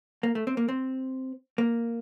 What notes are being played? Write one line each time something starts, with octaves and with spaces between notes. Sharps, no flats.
A#3
A3
C4
A#3
C4
A#3